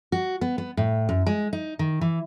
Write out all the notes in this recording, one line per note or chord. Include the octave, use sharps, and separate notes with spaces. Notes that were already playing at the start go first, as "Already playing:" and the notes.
F#4
B3
B3
A2
F#2
G#3
D#4
D#3
E3